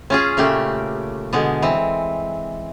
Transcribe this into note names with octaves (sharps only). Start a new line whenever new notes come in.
C#4 F4 G#4
A#2 C#3 A3 G4
B2 D3 G#3
E3 C4